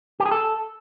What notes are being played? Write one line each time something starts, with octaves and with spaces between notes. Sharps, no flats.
G4
G#4
A4